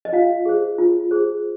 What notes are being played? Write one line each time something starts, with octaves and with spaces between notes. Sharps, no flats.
D#5
F4 F5
G#4 C5
F4
G#4 C5